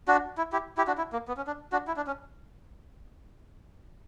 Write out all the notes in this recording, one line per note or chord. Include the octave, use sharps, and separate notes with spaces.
D4 F#4
E4
E4 G4
E4 G4
D4 F#4
E4
A#3
B3
C#4
D4
D4 F#4
E4
D4
C#4